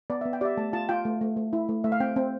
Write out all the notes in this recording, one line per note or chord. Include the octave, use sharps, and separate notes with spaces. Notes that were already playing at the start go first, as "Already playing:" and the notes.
B3 D5
E5
B3
G5
G4 D5 E5
A3 A5
F4 A5
F4 G5
A3
A3
A3
E4
A3
A3 E5
F5
C4 G5
C4